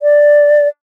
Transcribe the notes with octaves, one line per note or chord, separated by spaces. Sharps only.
D5